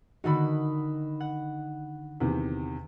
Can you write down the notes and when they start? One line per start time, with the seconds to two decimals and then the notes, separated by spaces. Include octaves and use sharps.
0.24 D3 D#3 D#4 F#4 B5
1.20 F#5
2.20 E2 C3 D#3